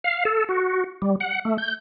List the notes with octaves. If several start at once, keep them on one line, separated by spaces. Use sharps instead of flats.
F5
A4
F#4
G3
F#5
A3
G6